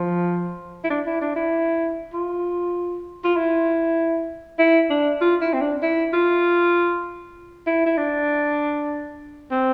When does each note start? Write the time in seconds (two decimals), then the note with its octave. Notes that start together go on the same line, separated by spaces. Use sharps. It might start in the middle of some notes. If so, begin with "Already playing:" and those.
Already playing: F3
0.84 E4
0.90 D4
1.06 E4
1.21 D4
1.36 E4
2.13 F4
3.24 F4
3.36 E4
4.59 E4
4.90 D4
5.21 F4
5.41 E4
5.53 C4
5.61 D4
5.82 E4
6.13 F4
7.67 E4
7.86 E4
7.97 D4
9.51 C4